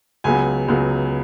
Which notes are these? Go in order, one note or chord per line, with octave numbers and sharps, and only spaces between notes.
C#2 C#3 F#3 B3 G#5
C#2 C#3 F#3 B3